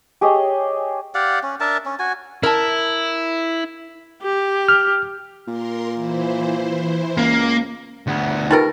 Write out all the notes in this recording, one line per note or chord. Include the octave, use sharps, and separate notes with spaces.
G4 G#4 C#5 D#5
G4 D5 F5 F#5
C#4
D4 A#4 E5 A5
C#4
F#4 G#5
E4 A#4 A5
G4
F6
A#2 A#4 C6
E3 E4 C5
C#2 A#3
D2 B3
G3 A3 D#4 F4 A#4 B4